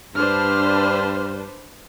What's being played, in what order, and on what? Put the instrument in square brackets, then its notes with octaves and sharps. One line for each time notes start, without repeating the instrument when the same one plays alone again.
[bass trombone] G2 [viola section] D4 B4 C5 [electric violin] F6